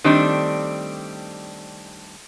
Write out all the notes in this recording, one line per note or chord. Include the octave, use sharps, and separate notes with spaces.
D#3 G3 A3 C4 D4